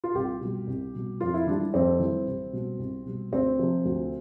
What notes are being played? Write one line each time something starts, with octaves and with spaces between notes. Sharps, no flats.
F4
C2 G4
B2 G3
C2
B2 G3
F2 F4
E4
E3 G3 D4
F2 C4
E3 G3
C2
B2 G3
C2
B2 G3
D2 C4
C3 F3
D2